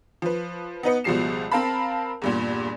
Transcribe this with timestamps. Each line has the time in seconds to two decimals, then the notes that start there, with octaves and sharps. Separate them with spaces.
0.22 F3 B4
0.83 B3 D#4 B4 C#7
1.04 C#2 B2 F3 G3 C7 E7
1.52 C4 A#4 F5 A5 B5
2.22 E2 G2 A#2